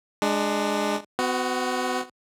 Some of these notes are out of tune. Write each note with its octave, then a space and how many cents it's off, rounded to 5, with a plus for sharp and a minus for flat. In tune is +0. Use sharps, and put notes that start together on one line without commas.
G#3 +0 D4 +20
B3 +40 F#4 +0